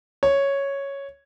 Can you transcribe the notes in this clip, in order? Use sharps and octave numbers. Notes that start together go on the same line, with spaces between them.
C#5